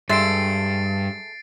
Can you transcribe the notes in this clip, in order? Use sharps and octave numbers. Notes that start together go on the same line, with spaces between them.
G2 G#3 A3 E5 A6 C7 D7